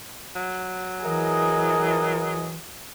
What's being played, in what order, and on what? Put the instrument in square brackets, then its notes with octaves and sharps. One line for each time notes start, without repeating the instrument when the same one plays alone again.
[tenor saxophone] F#3
[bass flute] E3 [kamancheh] G#4 D#5 [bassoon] A#4